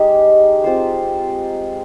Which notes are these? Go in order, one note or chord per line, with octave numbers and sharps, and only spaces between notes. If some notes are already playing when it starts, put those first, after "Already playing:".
Already playing: G#3 D#4 G4
C4 F4 C5